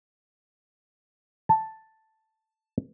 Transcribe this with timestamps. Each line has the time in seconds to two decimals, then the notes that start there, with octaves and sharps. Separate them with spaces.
1.49 A5